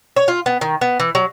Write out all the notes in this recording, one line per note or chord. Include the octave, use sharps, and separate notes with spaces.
C#5
F4
B3
D#3
B3
E3
F#3